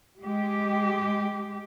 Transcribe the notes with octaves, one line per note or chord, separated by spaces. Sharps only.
G#3 G4